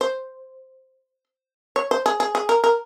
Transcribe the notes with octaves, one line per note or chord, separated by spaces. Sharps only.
C5
C#5
C5
G#4
G#4
G#4
A#4
A#4